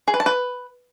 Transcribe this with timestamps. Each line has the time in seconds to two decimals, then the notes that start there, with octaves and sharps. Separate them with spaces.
0.08 G#4
0.14 B4
0.20 A5
0.26 B4